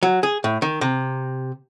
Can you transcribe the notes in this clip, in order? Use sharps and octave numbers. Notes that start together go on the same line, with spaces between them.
F#3
G#4
A2
D#3
C3